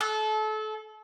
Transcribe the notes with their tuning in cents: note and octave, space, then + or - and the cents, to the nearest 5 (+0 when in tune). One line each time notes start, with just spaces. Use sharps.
A4 -30